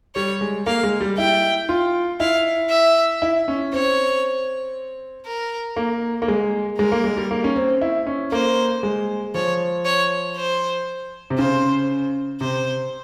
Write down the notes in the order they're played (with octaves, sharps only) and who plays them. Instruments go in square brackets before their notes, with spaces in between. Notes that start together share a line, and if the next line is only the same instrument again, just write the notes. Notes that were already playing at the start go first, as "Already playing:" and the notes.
[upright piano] G3 [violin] C#5
[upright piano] G#3
[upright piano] A#3 [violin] F5
[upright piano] G#3
G3
[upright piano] E4 [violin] G5
[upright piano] F4
[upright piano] E4 [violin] F5
[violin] E5
[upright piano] E4
C#4
[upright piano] C4 [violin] C#5
[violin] A#4
[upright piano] A#3
A#3
G#3
[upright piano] G#3 [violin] A#4
[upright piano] A#3
G#3
G3
A#3
C#4
C4
E4
C#4
[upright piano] A#3 [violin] C5
[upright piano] G#3
[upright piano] F3 [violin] C#5
[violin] C#5
C5
[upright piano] C3
[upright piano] C#3 [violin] C5
[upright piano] C3 [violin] C5